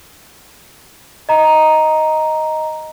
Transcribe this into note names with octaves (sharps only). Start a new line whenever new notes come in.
D#5 A#5